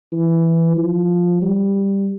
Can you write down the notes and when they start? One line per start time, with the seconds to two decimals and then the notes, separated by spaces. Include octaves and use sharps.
0.12 E3
0.77 F3
1.42 G3